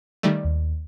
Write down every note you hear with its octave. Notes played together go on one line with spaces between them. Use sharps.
D#3 G3 A3 D5
D#2